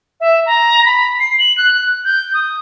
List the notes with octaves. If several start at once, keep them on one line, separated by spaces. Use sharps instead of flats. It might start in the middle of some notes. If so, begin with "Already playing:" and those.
E5
A#5
B5
C7
F#7
F#6
F#6
G6
D#6